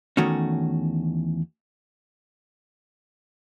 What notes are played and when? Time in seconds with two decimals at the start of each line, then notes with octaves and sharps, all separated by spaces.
0.17 E2 D#3 A3 C#4 F#4